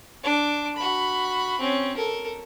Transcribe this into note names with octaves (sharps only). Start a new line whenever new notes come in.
D4 D6
F#4 B5
C4 C#4
A4 A#4